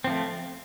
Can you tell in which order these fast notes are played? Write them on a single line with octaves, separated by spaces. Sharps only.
C4 F3 A3